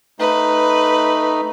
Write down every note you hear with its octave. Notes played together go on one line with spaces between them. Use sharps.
A3 D#4 B4